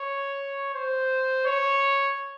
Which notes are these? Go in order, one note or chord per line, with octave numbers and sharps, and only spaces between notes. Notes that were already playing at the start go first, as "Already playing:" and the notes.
Already playing: C#5
C5
C#5